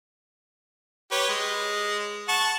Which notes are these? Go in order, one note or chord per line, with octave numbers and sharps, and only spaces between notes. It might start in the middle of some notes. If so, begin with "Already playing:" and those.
G4 B4 C#5
G#3
F#5 A5 C#6